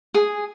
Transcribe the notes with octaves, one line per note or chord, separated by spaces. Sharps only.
G#4